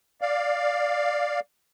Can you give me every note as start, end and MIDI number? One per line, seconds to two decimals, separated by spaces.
0.21 1.40 74
0.21 1.40 77